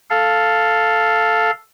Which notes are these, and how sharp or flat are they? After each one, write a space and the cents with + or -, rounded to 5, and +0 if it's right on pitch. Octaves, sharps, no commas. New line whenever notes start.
A4 +0 F5 +0